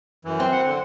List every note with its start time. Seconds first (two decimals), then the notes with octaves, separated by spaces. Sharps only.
0.25 F#2 E3
0.40 C4
0.52 F#5
0.66 D3